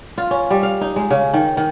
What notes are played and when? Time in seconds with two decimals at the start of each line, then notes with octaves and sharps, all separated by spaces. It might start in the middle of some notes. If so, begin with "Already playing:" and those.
0.18 F4
0.31 C#4
0.50 G3
0.63 F5
0.81 D#4
0.96 G#3
1.10 C#3
1.34 D#3
1.57 D#3